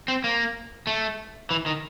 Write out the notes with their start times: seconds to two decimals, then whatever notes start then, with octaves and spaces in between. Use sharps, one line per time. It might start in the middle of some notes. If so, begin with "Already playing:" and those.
0.08 C4
0.24 A#3
0.87 A3
1.51 E3
1.66 D#3